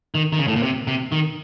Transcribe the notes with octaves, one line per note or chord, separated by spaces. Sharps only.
D#3
D#3
C#3
A2
A#2
C3
C3
D#3